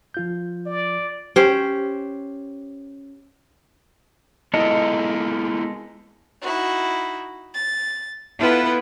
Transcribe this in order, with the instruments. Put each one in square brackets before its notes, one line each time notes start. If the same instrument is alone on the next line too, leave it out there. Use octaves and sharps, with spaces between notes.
[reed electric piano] F3 F4 G6
[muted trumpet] D5
[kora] C#4 G4 C5
[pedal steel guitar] G#3 A4 A#4 [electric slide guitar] B3 E4 F4 [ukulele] D#5
[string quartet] D#4 E4 F#4
A6
B3 E4 F4 A4 B4